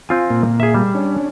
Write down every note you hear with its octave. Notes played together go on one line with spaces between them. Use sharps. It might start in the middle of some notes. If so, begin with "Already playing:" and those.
C4 F4 G#5
A#2 A#3
G#4 E5
G3
C#4 D4